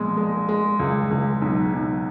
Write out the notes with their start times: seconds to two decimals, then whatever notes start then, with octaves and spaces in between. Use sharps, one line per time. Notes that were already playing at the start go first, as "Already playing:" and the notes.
Already playing: A#1 B2 G#3
0.17 G#3
0.49 G#3
0.79 C#2
1.11 C#2
1.42 B1
1.73 B1